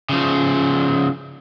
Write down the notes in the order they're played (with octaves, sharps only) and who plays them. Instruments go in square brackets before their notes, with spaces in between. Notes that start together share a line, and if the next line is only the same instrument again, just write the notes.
[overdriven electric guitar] C#3 F3